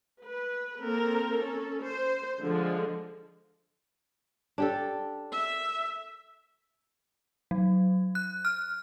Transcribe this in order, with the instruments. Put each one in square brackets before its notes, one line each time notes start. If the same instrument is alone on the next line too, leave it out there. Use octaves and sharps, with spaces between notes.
[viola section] B4
A#3 C4 A4 A#4
C#4 A4
C5
D3 F3 G#3
[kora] D4 G4 A4
[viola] E5
[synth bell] F#3
F#6
F6